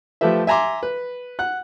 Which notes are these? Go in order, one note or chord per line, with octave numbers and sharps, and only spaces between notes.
F3 A3 G4 B4 E5
E5 G#5 A#5 C6 D6
B4
F#5 F#6